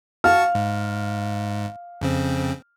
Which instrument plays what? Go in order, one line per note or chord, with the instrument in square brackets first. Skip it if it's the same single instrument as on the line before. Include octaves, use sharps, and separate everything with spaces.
[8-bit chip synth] F#4 A5 C#6 [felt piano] F5 F6
[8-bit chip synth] G#2
F2 C#3 C4